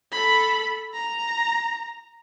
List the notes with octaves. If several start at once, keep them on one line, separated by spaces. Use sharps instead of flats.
A4 B5
A#5